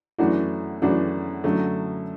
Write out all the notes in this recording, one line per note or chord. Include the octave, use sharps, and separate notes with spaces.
F#2 E3 A3 D4 F#4
F#2 E3 A3 D4 F#4
F#2 D3 F#3 A3